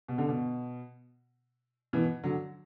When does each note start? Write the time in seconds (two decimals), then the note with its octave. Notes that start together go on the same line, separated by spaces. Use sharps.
0.08 B2
0.18 D3
0.28 B2
1.93 B2 E3
2.24 D3 F#3